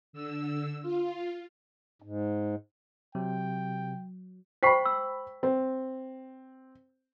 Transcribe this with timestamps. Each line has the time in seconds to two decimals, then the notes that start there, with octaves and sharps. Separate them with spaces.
0.13 D3 E6
0.82 F4
2.02 G#2
3.15 C3 F#3 G5
4.63 C5 G5 B5 C#6 B6
4.85 E6
5.43 C4